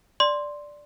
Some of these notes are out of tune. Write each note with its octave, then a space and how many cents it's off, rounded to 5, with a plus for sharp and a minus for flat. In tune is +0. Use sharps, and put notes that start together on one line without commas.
D5 +0 C6 +0